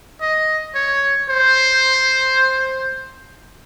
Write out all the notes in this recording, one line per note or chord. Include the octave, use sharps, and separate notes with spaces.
D#5
C#5
C5